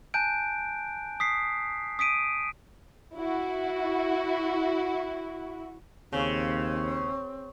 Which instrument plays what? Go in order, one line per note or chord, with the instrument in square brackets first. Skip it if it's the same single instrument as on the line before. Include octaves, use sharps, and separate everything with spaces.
[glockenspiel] G#5 A5 F#6 G6 D7
D#6 B6 C7
D#6 B6 D7 D#7
[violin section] E4 F#4
[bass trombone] D#2 [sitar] C#3 [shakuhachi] C4